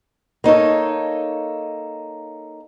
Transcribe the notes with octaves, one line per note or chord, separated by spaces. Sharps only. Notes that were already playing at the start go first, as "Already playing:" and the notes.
A#3 D#4 A4 C#5